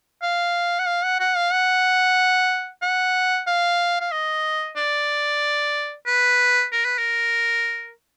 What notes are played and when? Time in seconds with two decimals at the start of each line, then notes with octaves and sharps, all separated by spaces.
0.22 F5
0.79 F#5
0.87 F5
1.04 F#5
1.20 F#5
1.36 F5
1.52 F#5
2.82 F#5
3.47 F5
4.00 F5
4.12 D#5
4.77 D5
6.07 B4
6.72 A#4
6.85 B4
6.98 A#4